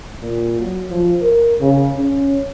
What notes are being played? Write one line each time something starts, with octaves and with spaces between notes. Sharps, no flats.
A#2
F#3
F3
A#4
C#3
C#4